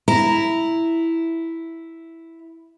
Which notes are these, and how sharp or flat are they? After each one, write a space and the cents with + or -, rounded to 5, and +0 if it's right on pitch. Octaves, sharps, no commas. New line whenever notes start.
E4 +0 A#5 -5